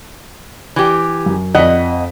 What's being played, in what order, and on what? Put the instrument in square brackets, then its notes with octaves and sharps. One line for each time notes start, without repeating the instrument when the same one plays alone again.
[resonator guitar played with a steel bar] E3 G4
[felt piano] F#2
[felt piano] F2 B6 [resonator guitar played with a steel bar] D#5 F#5